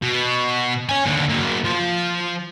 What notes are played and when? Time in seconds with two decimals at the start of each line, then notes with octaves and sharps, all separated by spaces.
0.02 B2
0.89 C#5 G#5
1.06 D#2 D3
1.29 F#3 A#3
1.64 F3